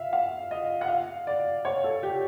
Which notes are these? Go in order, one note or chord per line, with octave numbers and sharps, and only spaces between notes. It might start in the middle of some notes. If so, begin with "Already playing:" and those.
Already playing: E5 F5
F5
D#5
F#5
F5
D5
C#5
A4
G4